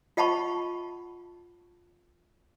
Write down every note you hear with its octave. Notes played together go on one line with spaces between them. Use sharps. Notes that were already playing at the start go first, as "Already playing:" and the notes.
F4 D#5 F#5 A5 B5 C#6